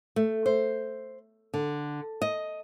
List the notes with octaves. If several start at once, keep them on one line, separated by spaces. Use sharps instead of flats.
A3
C5
D3
D#5